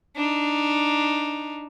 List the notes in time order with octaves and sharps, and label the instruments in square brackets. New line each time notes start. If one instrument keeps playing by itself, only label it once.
[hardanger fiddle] D4 D#4